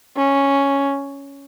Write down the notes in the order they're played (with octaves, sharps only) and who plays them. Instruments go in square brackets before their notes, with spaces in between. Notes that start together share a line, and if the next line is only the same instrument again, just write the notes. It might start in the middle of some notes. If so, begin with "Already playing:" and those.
[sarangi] C#4